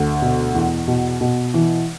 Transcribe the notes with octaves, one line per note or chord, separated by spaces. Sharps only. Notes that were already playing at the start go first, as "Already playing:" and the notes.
Already playing: D2
B2
E2
B2
B2
E3